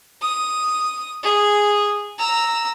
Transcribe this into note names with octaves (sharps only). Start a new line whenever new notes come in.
D#6
G#4
A#5 E6